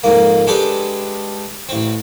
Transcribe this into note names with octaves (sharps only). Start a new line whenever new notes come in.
F2 G#2 A#3
G#3 D4 G4 A4 B4 D5
A1 C4